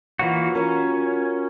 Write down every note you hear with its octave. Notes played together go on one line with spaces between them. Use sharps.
E3 F#3 A#3 F4 F#4
C#4 A#4 C#5